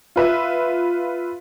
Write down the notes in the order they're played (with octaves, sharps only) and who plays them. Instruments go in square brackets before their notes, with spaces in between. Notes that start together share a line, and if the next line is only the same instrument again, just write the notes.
[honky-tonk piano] F4 B4 E5